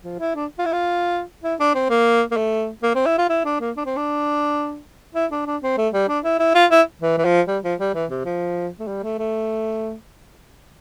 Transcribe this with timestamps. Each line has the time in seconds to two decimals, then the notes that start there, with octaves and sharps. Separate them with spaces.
0.04 F3
0.19 E4
0.35 D4
0.58 F4
0.66 E4
0.73 F4
1.44 E4
1.60 D4
1.75 C4
1.90 A#3
2.31 A#3
2.37 A3
2.83 A#3
2.95 C4
3.06 E4
3.18 F4
3.29 E4
3.45 D4
3.60 A#3
3.77 D4
3.86 C4
3.97 D4
5.15 E4
5.32 D4
5.46 D4
5.62 C4
5.78 A3
5.93 G3
6.08 D4
6.24 E4
6.39 E4
6.55 F4
6.70 E4
7.02 E3
7.18 E3
7.25 F3
7.47 G3
7.64 F3
7.80 G3
7.95 E3
8.10 C3
8.25 F3
8.80 A3
8.87 G3
9.03 A3
9.19 A3